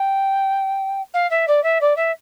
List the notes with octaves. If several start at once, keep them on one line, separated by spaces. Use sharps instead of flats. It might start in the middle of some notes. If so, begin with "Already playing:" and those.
Already playing: G5
F5
E5
D5
E5
D5
E5